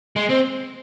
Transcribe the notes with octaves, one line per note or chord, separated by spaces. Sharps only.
G#3
C4